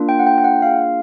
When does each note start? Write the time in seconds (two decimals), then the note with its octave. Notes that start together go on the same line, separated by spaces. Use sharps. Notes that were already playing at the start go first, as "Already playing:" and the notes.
Already playing: A#3 D4 F4
0.09 G5
0.19 F#5
0.27 G5
0.38 G5
0.44 F#5
0.62 A#3 D4 F4 G#4 F5